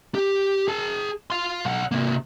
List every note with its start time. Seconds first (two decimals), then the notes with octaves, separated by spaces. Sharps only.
0.15 G4
0.68 G#4 A5
1.30 F5 C6
1.65 B1 F#5
1.91 C3 A#3